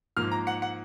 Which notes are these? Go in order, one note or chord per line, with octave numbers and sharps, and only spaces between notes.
G#2 F3 A#3 F6
A#5
F#5
F#5